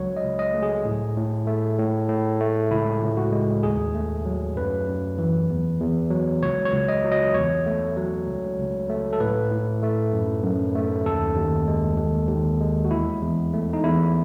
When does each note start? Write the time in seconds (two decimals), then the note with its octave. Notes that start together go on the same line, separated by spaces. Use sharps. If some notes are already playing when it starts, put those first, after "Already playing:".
Already playing: C#2 F#3 C#5
0.17 D#5
0.24 C#2
0.39 D#5
0.54 A3
0.63 G#4
0.85 A2
1.17 A2
1.47 A3
1.79 A2
2.09 A2
2.40 A3
2.70 C#2 E4
3.02 C#2
3.17 F#4
3.32 G#3
3.63 D#2 G#4
3.95 A3
4.25 F#3
4.56 F#2 B4
4.87 F#2
5.18 E3
5.50 E2
5.80 E2
6.11 F#3
6.43 C#2 C#5
6.65 C#5
6.73 C#2
6.88 D#5
7.04 F#3
7.12 D#5
7.34 E2 C#5
7.66 A3
7.97 F#3
8.28 C#2
8.59 C#2
8.89 A3
9.13 A4
9.20 A2 B4
9.51 A2
9.83 A3
10.13 F#2
10.43 F#2
10.75 A3
11.05 D#2 A4
11.36 D#2
11.68 G#3
11.98 D#2
12.29 D#2
12.61 G#3
12.85 F#4
12.91 E2 E4
13.23 E2
13.54 A3
13.73 D#4
13.84 E2 E4